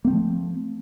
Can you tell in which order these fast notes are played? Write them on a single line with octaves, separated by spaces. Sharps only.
A#3 C4 A3 F3